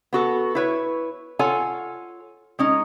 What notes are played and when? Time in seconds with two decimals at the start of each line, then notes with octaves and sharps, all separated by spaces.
0.13 B3 F#4 A4
0.55 E4 B4 C#5
1.39 F4 A4 C#5 F#5 G#5
2.59 G#3 C#4 D#4